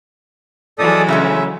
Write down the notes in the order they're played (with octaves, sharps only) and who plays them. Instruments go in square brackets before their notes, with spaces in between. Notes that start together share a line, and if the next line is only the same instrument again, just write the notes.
[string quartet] E3 F#3 G#3 [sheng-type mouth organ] A4 D5 D#6
[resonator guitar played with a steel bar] C#3 A3 C#4 [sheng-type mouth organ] E5